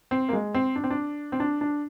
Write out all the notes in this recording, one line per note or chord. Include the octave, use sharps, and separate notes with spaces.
C4
A#3
G#3
C4
D4
C4
D4
C4
D4
D4